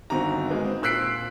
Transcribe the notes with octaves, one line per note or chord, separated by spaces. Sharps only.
G1 D#3 C4 F#4 A#5
G#3 A#3 B3 D#4
C4
A#2 E6 F#6 B6 C7 D7